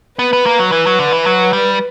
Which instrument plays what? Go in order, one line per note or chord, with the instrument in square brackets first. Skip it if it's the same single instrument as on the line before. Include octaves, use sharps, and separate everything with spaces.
[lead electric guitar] B3 [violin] B4
[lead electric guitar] B3
A#3
F#3
[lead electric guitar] E3 [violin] B4
[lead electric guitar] F#3
D3
E3
F#3
G3